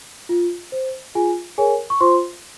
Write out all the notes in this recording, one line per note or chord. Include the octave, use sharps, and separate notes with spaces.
F4
C5
F4 G#4 G#5
G#4 A#4 C#5 G#5
C#6
F4 C5 C6